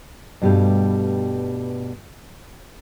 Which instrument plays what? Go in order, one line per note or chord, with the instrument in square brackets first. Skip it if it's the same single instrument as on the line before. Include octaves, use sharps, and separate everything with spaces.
[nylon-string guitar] G2 B2 G3 A3 G4 F5